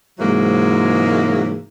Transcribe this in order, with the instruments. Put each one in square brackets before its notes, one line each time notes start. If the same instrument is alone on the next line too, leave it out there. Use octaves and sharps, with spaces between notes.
[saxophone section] G#2 C3 E3 F#3 G#3 A#3